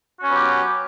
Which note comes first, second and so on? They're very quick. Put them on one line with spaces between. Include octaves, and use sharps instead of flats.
F#4 C#4 B3 F#3 G4